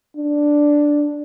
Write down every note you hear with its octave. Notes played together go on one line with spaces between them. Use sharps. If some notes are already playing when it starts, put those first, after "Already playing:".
D4